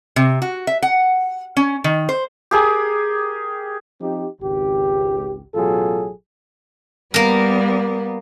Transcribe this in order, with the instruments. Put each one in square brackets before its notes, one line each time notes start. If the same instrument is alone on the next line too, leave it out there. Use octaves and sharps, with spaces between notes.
[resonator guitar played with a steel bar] C3
F#4
E5
F#5
C#4
D#3
C5
[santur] G4 G#4 A#4
[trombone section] F3 C4 D#4 G4
G#1 C#2 G4
A1 B2 F#3 F4 G#4 A4
[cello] G3 B3 [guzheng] A#3 A#4